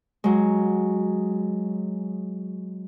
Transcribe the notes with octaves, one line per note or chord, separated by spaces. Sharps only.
F#3 G#3